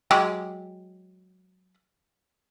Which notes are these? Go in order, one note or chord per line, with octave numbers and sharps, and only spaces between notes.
F#3 G#3 G4